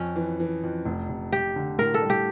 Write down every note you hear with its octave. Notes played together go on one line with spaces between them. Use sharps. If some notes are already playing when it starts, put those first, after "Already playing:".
Already playing: F2 C#4
E3
E3
F2
F1
F1
F1 G4
D3
A2 A#4
A4
G3
G4